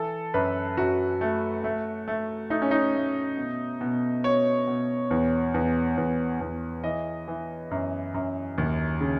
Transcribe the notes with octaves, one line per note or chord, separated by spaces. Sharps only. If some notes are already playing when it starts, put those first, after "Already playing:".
Already playing: E3 A4
F#2 B4
F#2 F#4
A3
A3
A3
A3 D#4
C#4
D#4
A3
B2
B2
B2 C#5
B2
E2
E2
E2
E2
E3 D#5
E3
F#2
F#2
D#2
C#3